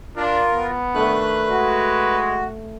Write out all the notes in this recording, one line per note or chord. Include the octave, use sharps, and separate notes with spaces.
D4 F4 A#4
B3
D#3 A3 D4 B4 F#6
G#3 F#4